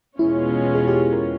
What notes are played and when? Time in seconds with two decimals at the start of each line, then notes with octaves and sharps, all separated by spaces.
0.19 E2 B2 G#3 C#4 E4 F4
0.75 G#4
0.88 G4
0.94 G#4
1.13 A#4